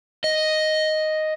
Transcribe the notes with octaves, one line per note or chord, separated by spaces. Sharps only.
D#5